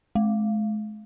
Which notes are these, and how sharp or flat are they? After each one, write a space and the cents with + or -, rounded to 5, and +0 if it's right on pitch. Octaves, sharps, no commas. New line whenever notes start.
G#3 +45